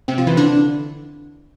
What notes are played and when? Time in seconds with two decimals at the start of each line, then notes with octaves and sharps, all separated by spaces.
0.08 C3 C4
0.18 F3 F4
0.27 E3 E4
0.36 D3 D4